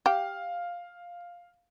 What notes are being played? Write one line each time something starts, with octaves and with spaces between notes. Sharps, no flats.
G4 F5